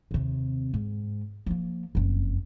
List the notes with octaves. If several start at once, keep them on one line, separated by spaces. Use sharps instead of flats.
D#2 C3
G#2
F3 A#3
F#1 F2